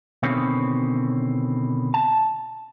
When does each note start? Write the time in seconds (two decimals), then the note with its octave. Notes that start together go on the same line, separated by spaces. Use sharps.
0.23 B2 D3 D#3 C4 C#4
1.94 A5